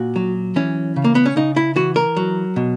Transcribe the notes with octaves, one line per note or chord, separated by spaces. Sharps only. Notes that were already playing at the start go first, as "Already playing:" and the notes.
Already playing: A#2 F#4
F#3
E3 C#4
C#3
A#3
B3
C#4
C#3 D#4
E4
E3 F#4
A#4
F#3
B2